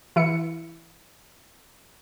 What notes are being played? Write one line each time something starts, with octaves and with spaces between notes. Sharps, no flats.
E3 E4 C#7